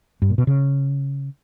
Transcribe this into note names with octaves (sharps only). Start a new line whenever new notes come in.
G2
A#2
B2
C#3